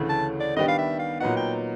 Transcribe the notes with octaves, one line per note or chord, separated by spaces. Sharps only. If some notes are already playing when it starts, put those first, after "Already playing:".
Already playing: D2 C#3 E3 A3
A5
D5
D#3 G3 B3 D4 G4 D#5
F5
E5
F5
A#2 F#3 B3 D#4 F#5
G5